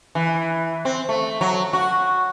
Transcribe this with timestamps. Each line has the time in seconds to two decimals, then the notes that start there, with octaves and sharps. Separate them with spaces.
0.15 E3
0.85 C4
1.09 A3
1.41 F#3
1.73 F#4